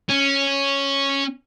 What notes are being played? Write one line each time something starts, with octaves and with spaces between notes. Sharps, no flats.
C#4